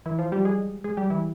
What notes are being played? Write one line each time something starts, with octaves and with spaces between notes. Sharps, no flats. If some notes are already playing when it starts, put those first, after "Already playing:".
E3 E4
F3 F4
G3 G4
G#3 G#4
G#3 G#4
G3 G4
E3 E4